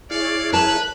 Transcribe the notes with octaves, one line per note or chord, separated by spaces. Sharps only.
E4 G#4 C#5 D5 F5
A#4 B4 A5 F#6